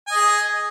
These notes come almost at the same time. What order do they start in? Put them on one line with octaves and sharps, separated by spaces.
G#5 D#5 G#4